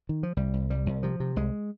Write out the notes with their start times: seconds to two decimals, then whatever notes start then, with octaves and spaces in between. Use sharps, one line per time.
0.09 D#3
0.23 F3
0.37 C2 G3
0.54 C2
0.70 C2 G3
0.86 C2
1.03 C3 F3
1.20 C3
1.36 C2 G#3